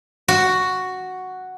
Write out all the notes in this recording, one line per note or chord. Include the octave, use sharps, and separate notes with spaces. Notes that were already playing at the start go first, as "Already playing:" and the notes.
F#4